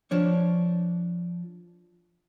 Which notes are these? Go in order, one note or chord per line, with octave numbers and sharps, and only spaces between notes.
F3 D4 C#5